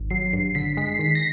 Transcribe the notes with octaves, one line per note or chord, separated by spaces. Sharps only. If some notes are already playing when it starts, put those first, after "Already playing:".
Already playing: G#1
F#3 C7
G2 C7
D3 B6
G#3 B6
C7
D#3 B6
A#6